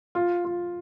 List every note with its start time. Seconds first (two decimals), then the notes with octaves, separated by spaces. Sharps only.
0.15 F4
0.45 F4